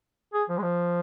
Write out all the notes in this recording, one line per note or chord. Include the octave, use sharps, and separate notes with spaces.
G#4
F3
G#3
F3